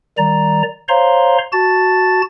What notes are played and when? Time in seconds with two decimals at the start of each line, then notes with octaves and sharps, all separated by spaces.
0.18 D#3 G3 D5 A#5
0.89 C5 C#5 F5 A#5 C6
1.52 F#4 A5 A6